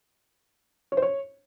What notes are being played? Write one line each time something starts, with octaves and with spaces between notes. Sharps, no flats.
C#5
C5
C#5